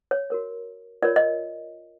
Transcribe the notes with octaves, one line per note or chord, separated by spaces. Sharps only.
C#5
F#4 A#4 C#5
F4 A#4 C#5 D5
D#5